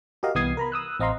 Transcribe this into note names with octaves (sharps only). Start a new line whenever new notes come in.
F#4 G4 A#4 D#5 F5
C2 E3 B3 D#6 G#6 C7
A#4 A#5 B5
D#6 E6 F#6
A1 C4 D#5 F5 A#5 C6